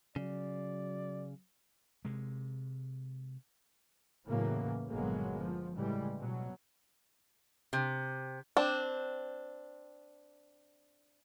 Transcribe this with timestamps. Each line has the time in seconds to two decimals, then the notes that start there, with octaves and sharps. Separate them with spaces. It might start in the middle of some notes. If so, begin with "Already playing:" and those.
0.16 C#3 F#3 D5
2.05 C3 G#3
4.27 E2 A2 C#3 E3 F#3 A#3
4.89 G1 A#2 F#3 G#3 A#3 B3
5.40 F3
5.74 A2 C#3 E3 G3 G#3
6.18 B2 F#3
7.73 C3
8.57 C4 D4